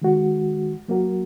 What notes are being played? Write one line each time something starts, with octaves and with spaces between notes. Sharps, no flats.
D#3 G#3 F#4
F#3 A#3 F#4 A#4